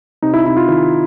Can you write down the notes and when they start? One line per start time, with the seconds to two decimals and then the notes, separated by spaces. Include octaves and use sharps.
0.22 C3 D#4
0.34 E4
0.46 C3 E4
0.57 F4
0.68 D#3 F4